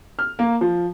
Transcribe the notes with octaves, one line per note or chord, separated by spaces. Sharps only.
F6
A#3
F3